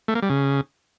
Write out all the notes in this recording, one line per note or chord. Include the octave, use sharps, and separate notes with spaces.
A3
A#3
G3
C#3